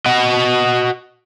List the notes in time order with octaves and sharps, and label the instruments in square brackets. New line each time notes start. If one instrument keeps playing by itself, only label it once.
[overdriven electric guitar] F#4 D#5